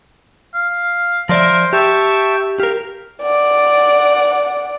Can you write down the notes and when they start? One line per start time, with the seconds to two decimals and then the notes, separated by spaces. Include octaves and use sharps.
0.54 F5
1.29 F3 A#4 C5 D5 E5 C6
1.73 G4 E5 G5 A5 C#6
2.60 G4 A#4 F5
3.22 D5 F#5